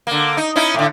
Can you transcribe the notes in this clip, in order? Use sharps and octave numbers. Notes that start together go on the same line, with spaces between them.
D3 A#3
D#4
C#4 D#4 E4
A2 D3